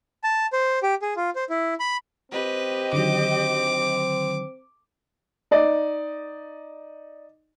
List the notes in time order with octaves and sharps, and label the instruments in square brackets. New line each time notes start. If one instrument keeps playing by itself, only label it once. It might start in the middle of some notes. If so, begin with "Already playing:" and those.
[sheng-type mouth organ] A5
C5
G4
G#4
F4
C5
E4
B5
[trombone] C4 [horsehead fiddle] G4 D#5 [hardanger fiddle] B4
[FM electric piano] D3 D#3 F#3 [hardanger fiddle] D6
[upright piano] D#4 D5 D#5